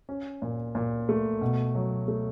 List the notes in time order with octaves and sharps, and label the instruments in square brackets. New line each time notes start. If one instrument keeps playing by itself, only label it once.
[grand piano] C#4
A#2
A#2
A3
B2
F#3
A3